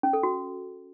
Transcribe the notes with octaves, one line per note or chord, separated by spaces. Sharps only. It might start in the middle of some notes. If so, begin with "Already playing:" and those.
C#4
A4
F#4